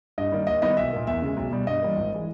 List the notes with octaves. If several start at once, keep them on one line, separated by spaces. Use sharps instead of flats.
G2 D#5
D#3 G3 A#3
D#2 D#5
D#3 G3 B3 D#5
B1 E5
A#2 A#3
E2 E5
C#3 G#3
B1
B2 G3
G2 D#5
E3 G3 A#3
G#1
E3 G#3